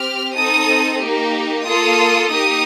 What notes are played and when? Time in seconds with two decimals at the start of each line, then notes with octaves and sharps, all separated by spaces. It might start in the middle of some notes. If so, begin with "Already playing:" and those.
Already playing: C4 G4 F6
0.35 C4 D#4 A4 D#6
1.01 A#3 D#4 G4
1.65 A#3 F4 A4 D#6
2.30 A#3 D#4 G4 D#6